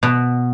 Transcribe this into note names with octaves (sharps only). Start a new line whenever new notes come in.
B2